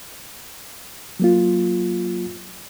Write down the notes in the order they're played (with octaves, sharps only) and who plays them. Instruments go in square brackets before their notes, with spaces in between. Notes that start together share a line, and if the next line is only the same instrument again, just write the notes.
[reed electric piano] F#3 A#3 F4